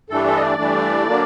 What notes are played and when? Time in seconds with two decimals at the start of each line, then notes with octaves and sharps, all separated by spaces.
0.10 G2 E3 A3 D4 A4
0.26 A4
0.36 D#5
0.41 D5
0.58 G2 E3 A3 D4
1.07 D3 F#3 A#3 D4